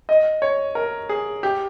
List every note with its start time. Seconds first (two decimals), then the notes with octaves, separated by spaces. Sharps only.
0.09 D#5
0.42 C#5
0.75 A#4
1.09 G#4
1.43 G4